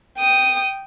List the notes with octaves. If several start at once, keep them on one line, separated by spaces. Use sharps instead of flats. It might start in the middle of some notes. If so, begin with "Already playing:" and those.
G5 D#6